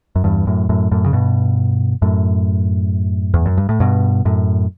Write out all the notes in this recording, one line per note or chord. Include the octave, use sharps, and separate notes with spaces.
F#2
E2 G2
F#2 A2
F#2 A2
F#2 A2
C#3
G2 B2
F#2 A2
E2
F#2
G2
A2
G2 B2
F#2 A2